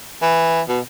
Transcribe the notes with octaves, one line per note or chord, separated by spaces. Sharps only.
E3
B2